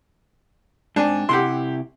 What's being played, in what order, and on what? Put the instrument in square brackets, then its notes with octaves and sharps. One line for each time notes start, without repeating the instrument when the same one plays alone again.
[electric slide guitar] G#2 C4 G#5 [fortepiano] D4
[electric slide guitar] C3 E4 E5 [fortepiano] G4 F#5 C6